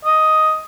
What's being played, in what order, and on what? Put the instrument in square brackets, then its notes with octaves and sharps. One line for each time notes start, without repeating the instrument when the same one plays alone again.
[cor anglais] D#5